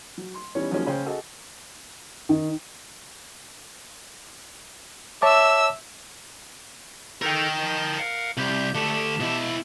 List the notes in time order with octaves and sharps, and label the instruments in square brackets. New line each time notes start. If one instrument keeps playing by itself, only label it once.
[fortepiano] F#3
C6
E2 E3 G3 C#4 D#4 C#5
D#3 F3 F#3 G#3 A#3 C#4
C#3 C#4 G#4 C5 G5
F#4 G#4 A4 D#5
[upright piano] D#3
[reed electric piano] C#5 A5 D6 [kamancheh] E5 E6
[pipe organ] D#3 D#4 A4 [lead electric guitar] A#4 G5
[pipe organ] F3
A#4 F5 F#5
[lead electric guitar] C2 [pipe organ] G4 G6
[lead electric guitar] D3 A3 [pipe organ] G4 A5
[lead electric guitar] B2 E4